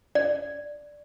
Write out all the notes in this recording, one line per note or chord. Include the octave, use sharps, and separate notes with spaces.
D5